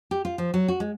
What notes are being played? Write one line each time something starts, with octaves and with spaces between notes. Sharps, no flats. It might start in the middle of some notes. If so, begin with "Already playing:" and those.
G4
F4
F3
F#3
F#4
G#3